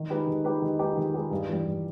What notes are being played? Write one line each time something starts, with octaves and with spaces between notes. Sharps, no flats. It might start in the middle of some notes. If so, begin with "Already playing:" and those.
Already playing: D#3
G#3 D#4 G4 B4
D#3
G#3 D#4 G4 B4
D#3
G#3 D#4 G4 B4
D#3
G#3 D#4 G4 B4
G2
E3 G3
G2